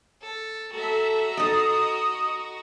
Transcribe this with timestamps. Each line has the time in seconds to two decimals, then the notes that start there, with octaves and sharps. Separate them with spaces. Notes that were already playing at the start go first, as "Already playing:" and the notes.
0.22 A4
0.73 F#4 A4 E5 A#5
1.37 D#4 A4 D#5 D#6